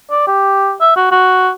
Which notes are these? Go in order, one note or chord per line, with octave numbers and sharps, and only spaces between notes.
D5
G4
E5
F#4
F#4